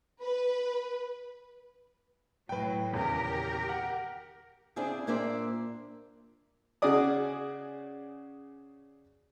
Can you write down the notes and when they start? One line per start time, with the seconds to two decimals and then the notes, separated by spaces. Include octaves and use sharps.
0.22 B4
2.49 A2 F#3 B4 G5
2.93 D#1 E2 C#3 G4 A#4
3.68 F#5 F6
4.76 C#3 C4 D4 E4 G#4
5.07 A#2 A#3 D4 C5 D5 E5
6.82 C#3 F#4 G#4 D5 D#6